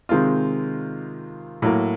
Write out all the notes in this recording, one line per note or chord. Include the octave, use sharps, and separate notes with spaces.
C3 D#3 G#3 C4 F4
A2 F#3 A#3